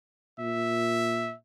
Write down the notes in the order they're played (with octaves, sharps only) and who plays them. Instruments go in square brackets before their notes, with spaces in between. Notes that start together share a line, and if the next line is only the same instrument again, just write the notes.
[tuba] A#2 [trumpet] E5